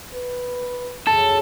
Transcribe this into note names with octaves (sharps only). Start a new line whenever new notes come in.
B4
E1 C#2 F#2 A4 A5